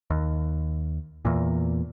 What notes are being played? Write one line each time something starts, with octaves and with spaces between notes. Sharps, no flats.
D#2
E2 A#2